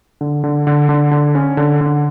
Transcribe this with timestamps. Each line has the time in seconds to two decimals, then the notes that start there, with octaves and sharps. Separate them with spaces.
0.21 D3
0.44 D3
0.67 D3
0.89 D3
1.11 D3
1.35 C#4
1.57 D3
1.81 D3